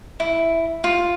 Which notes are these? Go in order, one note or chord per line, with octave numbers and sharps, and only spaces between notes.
E4
F4